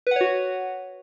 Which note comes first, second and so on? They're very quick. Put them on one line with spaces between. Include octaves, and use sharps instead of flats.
B4 F#5 C#5 F#4